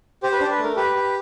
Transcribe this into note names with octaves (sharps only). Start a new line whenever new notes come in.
G4 C5
B4
D4 C5
B4
A3
A#4
G4 B4
G4